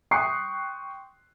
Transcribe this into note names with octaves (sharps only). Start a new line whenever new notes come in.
G5 C6 C#6 D#6 F#6 C7